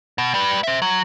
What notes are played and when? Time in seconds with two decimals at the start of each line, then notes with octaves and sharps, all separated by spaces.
0.18 B2
0.34 G3 B4
0.63 C5 E5
0.82 F#3